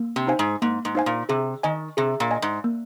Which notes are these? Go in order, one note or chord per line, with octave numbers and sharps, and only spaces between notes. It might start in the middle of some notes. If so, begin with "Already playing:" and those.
Already playing: A#3
C3
D#4 C5 F5 G#5
G#2
G#2 A#3
G#2
D#4 C5 F5 G#5
A#2
C3 G#4
D#3 D#5 G#5
C3 G#4
A#2
D#5 G#5
G#2
A#3